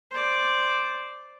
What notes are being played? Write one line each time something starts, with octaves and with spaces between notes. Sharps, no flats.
C5 D5